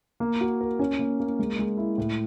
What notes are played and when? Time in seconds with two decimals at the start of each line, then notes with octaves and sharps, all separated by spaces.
0.20 A#3
0.41 F#4
0.61 A#4
0.79 C#4
0.99 A#3
1.20 A#3
1.39 G#3
1.59 G#3
1.77 E4
1.98 A2